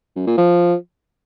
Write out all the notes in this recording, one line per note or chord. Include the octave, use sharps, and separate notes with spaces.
F#2
A#2
F3